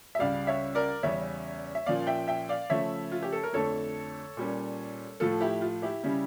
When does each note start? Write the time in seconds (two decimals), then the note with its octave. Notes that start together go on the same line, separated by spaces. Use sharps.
0.15 E5
0.19 C#2 C#3 G3 D5 F5
0.47 C#5 E5
0.75 A#4 D5
1.03 E2 C#3 G3 C#4 C#5 E5
1.75 E5
1.86 A#2 F3 C#4 D5 F5
2.07 E5 G5
2.28 E5 G5
2.49 D5 F5
2.70 C#3 F3 A3 C#5 E5
3.12 F4
3.22 G4
3.32 A4
3.43 A#4
3.53 F2 D3 A3 A4 C#5
4.37 A#2 G3 C#4
5.20 A2 F3 A3 F4 A4
5.40 E4 G4
5.61 F4
5.82 E4 G4
6.03 C#3 G3 C#4